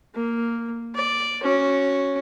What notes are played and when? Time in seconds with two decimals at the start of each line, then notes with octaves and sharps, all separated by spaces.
0.14 A#3
0.95 D5
1.43 C#4 F#4